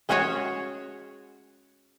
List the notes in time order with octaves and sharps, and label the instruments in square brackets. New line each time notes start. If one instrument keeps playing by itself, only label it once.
[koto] G#3 C#4 F#4 G#4 C#5